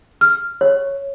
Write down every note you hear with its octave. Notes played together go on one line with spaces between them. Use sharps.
F6
C#5